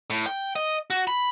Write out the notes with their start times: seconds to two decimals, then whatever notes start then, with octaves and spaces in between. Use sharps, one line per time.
0.10 A2
0.26 G5
0.56 D#5
0.90 F#4
1.07 B5